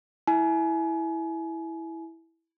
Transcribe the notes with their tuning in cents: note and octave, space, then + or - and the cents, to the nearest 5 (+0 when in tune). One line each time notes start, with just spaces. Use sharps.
E4 -5 G#5 +30